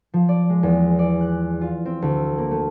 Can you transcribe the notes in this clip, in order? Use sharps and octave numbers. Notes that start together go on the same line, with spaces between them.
F3
D5
G#3
E2
D5
F#6
F4
C4
D2
A#3
A3